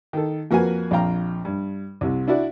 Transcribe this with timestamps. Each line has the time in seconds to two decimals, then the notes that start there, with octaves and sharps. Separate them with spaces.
0.13 D#3 A4
0.51 F2 A#3 F#4 B4 G#5
0.91 A#1 F2 F5 G5 A#5
1.45 G2
2.01 C2 C3
2.28 D4 E4 F#4 D5